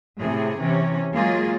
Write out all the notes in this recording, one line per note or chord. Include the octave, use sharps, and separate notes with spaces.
A2 C3 G#4
C3 E3 C#4
F#3 G#3 A#3 F4 G#4